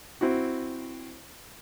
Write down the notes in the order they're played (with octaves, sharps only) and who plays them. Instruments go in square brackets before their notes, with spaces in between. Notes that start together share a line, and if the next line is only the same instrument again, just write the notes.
[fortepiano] C4 E4 F#4